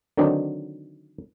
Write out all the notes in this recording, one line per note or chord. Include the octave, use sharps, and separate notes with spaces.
D3 D#3 F#3 C4 D4 D#4